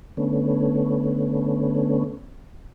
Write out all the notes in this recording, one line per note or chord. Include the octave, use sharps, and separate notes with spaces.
D3 A3 B3 C#4